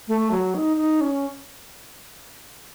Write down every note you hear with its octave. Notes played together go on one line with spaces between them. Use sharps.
A3
F#3
D#4
D#4
C#4